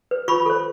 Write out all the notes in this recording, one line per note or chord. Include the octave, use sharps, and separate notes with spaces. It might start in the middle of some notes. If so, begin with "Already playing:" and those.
B4
F4 B5 C#6
A4 C5